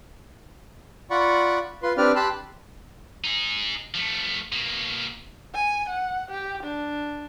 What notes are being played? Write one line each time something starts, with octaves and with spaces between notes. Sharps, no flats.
F4 D5 F#5 B5 C#6
F4 B4 C6
C4 D4 G4 B4 D5 F6
G4 A5 B5 C6 E6 F#6
D#4 G#4
F3 A3
B2 A#3
G#5
F#5
G4
D4